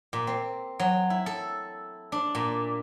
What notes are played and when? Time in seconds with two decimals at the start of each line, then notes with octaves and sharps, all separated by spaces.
0.13 A#2
0.27 C4
0.79 F#3
1.10 E4
1.26 A4
2.12 D4
2.35 A#2